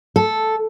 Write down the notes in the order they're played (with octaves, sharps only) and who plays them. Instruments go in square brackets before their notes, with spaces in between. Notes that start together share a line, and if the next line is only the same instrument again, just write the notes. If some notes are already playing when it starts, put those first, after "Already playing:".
[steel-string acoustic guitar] A4